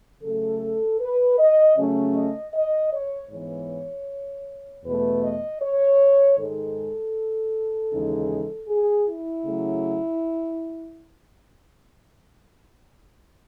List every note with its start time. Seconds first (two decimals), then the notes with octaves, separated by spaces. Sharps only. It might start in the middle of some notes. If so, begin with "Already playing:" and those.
0.23 C#3 F#3 A3 A4
1.00 B4
1.38 D#5
1.77 C#3 F#3 A3 C#4
2.15 D#5
2.54 D#5
2.92 C#5
3.30 G#2 E3 B3 C#5
4.84 E2 B2 A3 B4
5.22 D#5
5.60 C#5
6.37 G#2 D#3 G#3 D#4 A4
7.92 D#2 C#3 E3 G#3 D#4
8.68 G#4
9.07 E4
9.45 C#3 F#3 A3